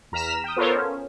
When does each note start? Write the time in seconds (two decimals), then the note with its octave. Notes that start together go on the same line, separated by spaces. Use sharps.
0.12 E2 A#5 F6 B6 E7
0.44 G5 D#6
0.56 B3 F4 A4 A#4 C5 C#5
0.75 C#4